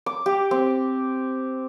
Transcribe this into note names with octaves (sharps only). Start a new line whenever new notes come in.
D6
G4
C4